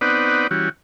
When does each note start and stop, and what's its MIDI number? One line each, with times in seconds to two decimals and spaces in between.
0.01 0.47 59
0.01 0.47 60
0.01 0.47 63
0.01 0.47 71
0.01 0.47 74
0.01 0.47 78
0.51 0.69 52
0.51 0.69 55
0.51 0.69 61
0.51 0.69 66